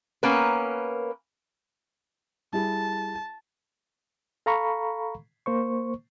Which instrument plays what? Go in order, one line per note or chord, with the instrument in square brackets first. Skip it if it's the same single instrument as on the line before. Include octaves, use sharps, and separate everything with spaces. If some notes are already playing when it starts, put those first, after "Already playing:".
[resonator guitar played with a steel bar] A#3 B3 C#4 A#4 B4
[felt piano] G3 E4 G#4 [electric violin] A5
[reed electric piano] A4 F5 A#5 B5 C#6
A#3 C5 C#6